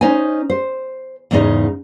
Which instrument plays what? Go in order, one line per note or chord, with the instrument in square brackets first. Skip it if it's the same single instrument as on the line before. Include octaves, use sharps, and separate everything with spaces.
[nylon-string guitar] C#4 D#4 C5 D#5 G#5
C5
E2 G#2 C#3 D#4 D#5